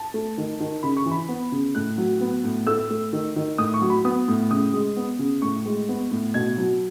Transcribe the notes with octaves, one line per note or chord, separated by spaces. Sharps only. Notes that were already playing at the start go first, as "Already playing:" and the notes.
Already playing: A5
A3
D#3
D#3
C#3 B5
C#6
E3
B5
B3
C#3
A2 F#6
F#3
B3
A2
A3 E6
A3
D#3
D#3
A2 D#6
C#6
F#3
B5
B3 D#6
A2
C#3 D#6
G#3
B3
C#3
A2 C#6
G#3
B3
A2
B2 G#6
F#3